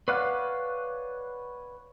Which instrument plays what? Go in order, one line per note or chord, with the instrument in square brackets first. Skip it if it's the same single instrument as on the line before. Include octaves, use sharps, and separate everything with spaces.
[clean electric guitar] B4 C#5 D5 F5 F#5